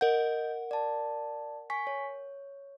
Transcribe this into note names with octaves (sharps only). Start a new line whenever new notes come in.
A#4 D#5 F#5 G6
D5 A5
G#5 C#6 B6
C#5